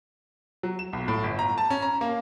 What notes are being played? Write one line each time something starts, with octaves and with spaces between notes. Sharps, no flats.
F#3
E7
B1
A2
G1
A#5
A5
C#4
A#5
A#3